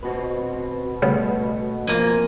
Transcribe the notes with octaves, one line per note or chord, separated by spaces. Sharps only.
B2 C4 F#4 B4
C#3 G3 A3 B3 F#4
F2 A#3 C4 F4 G#5